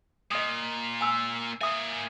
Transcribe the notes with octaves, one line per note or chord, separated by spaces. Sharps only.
A#2 D#5 D#6
G#5 E6
A#3 E5 G#5 D#6